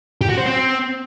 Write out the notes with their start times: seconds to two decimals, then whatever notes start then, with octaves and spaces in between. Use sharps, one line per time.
0.21 G4
0.30 F#4
0.38 C5
0.46 C4